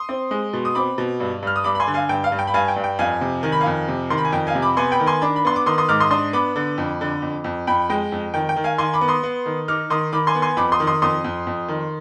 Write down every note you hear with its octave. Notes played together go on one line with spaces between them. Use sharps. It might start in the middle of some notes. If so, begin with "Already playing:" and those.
Already playing: C6 D#6
C4
G#3
B2
D#6
C4 B5 D6
B2
G2
G2 F6
D#6
G2 B5 D6
B5
G#5 C6
D3
F5 G#5
G2 G5
F5
G2
G5
B5
G2 F5 G#5
G5
G2
G5
F2 F5 G#5
C3
D#3 G#5
B5
F5 G#5
F2
C3
D#3 C6
B5
G#5
F2 G5
F5 G#5
C3
B5 D6
B3 G#5 C6
G5 B5
D#3
G#5 C6
D4 B5 D6
B5
B3 C6
D6
D#3 C6 D#6
C6 D#6
G#2 D6 F6
C6 D#6
D4 C6 D#6
B3 B5 D6
D3
F2
D3
F2
F2
F2 G5 B5
G#3 G5
F2
D#3 G5
G5
D#3
F5 G#5
D#3 G#5 C6
B5 D6
B3
C6 D#6
B3
D#3
D#4 D6 F6
D#3 C6 D#6
D#3 B5 D6
G#5 C6
B3
G#5 C6
F2 B5 D6
C6 D#6
D#3
C6 D#6
F2 C6 D#6
F2
F2
D#3